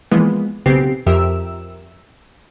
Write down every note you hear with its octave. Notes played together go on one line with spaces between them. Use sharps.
E3 F3 G#3 A#3 B3
B1 C#3 B3 C4 G4 C7
F2 F3 G4 A#4 E5 E6